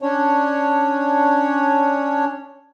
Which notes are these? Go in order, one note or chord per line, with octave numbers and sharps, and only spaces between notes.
C#4 D4 C#5